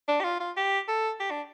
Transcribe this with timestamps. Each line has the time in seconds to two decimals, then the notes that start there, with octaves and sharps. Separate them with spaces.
0.08 D4
0.20 G4
0.24 F4
0.40 F4
0.57 G4
0.88 A4
1.20 G4
1.31 D4